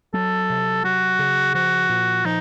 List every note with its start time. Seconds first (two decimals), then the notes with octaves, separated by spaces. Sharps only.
0.14 F#3 A4
0.50 C3
0.84 F#3 F#4
1.19 C#3
1.55 F3 F#4
1.89 A#2
2.25 F3 D#4